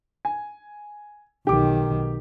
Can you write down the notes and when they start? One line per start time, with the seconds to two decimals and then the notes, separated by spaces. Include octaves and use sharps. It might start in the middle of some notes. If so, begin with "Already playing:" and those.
0.25 G#5
1.47 B1 D#3 G4 D6